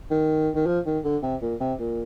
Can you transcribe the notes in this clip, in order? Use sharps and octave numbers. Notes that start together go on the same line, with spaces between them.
D#3
D#3
F3
D#3
D3
C3
A#2
C3
A#2